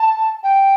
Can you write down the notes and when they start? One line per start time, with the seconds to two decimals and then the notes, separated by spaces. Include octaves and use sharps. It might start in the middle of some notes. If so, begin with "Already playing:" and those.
Already playing: A5
0.43 G5